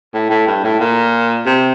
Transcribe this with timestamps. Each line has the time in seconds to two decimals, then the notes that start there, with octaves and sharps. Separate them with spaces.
0.14 A2
0.30 A2
0.47 G2
0.64 A2
0.80 A#2
1.46 C3